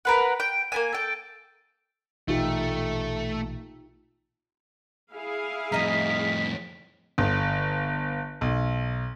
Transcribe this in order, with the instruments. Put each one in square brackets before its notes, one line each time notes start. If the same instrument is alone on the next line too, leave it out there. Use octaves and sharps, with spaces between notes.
[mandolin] A#4 B4 F#5
G5
A#3 B3 G#5
A4 G5
[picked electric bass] A#1 B2 E3 [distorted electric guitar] A3 [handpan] D#4 F4 G4
[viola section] E4 G#4 F5
[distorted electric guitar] F2 A2 [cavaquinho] D#5 A#5 [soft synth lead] B6
[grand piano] G1
B1